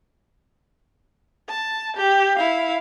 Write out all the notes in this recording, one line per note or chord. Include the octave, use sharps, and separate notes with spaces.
A5
G4
E4 F5